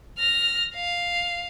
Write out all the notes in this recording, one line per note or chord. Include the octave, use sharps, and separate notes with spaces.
F6 A#6
F5